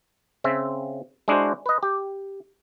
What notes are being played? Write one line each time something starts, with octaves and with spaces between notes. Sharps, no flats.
C#3 C4 E5
G#3 D4 E4 F#4 C5
B4 D#5
G4